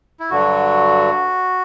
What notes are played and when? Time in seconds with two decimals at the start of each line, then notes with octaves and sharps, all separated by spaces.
0.20 E4
0.30 G2 D3 F#3 F#4